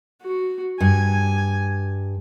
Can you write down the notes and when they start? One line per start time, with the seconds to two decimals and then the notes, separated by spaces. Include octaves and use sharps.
0.22 F#4
0.80 G2 G#5